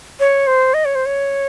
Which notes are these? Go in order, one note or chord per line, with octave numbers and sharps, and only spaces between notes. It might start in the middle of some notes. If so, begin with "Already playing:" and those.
C#5
C5
D#5
C#5
C5
C#5